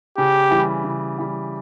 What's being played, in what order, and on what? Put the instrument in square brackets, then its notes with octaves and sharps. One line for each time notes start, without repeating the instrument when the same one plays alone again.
[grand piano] C#3 [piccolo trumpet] G4
[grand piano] E3 G3
C#3
E3 G3